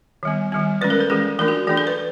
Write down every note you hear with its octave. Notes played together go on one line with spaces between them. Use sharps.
D#3 G3 B3
D#3 G3 B3
E3 G#3 C#4 B4
A#4
A4
E3 G#3 C#4 G#4
E3 A3 D4 A#4
F#4
E3 A3 D4 G#4
A4
B4